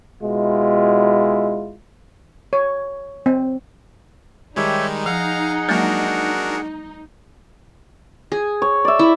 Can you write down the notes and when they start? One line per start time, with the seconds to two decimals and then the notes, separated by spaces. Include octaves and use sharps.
0.21 B2 G#3 E4 F4
2.53 C#5
3.26 C4
4.56 D#3 G3 G#3 D#4 G4 C#5 E5
5.06 F3 G#4 F5 F#5 A#5
5.68 F#3 G#3 A#3 D4 F#4 A#4
8.32 G#4
8.62 C#5
8.85 D5 E5
8.99 E4